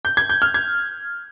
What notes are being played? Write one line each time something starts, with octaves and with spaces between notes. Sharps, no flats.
G6
G#6
G6
F6
G#6